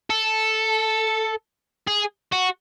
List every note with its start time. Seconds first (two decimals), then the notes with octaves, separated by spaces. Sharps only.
0.10 A4
1.87 G#4
2.32 F#4